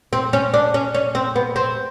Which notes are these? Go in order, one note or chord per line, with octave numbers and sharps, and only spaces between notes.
C4
C#4
D4
C#4
C#4
C4
B3
C4